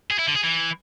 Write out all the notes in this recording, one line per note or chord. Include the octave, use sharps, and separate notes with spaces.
G#4
E4
D3
G#4
E3